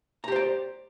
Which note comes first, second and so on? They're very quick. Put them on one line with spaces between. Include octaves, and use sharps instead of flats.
A#5 G4 C5 D5